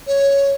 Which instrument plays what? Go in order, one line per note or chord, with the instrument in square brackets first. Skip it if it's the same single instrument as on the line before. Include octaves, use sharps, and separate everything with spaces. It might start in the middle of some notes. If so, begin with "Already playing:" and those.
[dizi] C#5